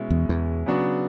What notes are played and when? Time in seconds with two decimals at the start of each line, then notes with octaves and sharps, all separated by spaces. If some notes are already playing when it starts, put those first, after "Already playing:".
Already playing: B2 G#3 C#4 E4
0.10 E2
0.29 E2
0.66 C#3 F#3 B3 D4 F#4